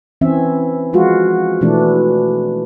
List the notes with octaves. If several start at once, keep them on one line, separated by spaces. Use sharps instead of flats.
E3 C4 C#4 E5
F3 G#3 F4 F#4
B2 E3 A3 D4